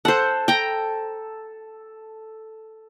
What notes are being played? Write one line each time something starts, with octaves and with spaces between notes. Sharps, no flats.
A4 C5 F#5
G5 A#5